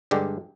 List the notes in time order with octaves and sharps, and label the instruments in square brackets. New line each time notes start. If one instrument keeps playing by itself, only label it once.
[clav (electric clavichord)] G2 D3 G#3 D4 G4